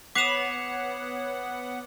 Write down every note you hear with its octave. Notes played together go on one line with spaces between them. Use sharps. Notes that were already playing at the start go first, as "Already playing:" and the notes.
B3 C#5 F#5 D6 B6 C7 E7 F7